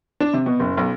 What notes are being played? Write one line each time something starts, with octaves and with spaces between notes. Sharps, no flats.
D4
C3
B2
F#1
B1